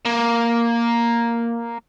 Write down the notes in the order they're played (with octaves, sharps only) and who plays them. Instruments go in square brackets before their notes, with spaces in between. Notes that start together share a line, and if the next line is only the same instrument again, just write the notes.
[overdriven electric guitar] A#3